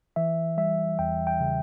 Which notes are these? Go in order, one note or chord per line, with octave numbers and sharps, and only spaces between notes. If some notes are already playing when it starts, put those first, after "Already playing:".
E3 E5
G3 E5
E2 G5
G5
C#3